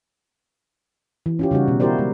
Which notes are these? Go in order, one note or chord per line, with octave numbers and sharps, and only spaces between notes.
E3
C#4 F4 G4
C#3 G3 D#4 F#4
B2
E4 F#4 G4 A#4 C5 D5
G#3